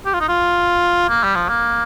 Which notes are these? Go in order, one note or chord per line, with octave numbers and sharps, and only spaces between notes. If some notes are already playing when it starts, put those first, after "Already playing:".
G4
F4
D#4
F4
A#3
G3
F3
A#3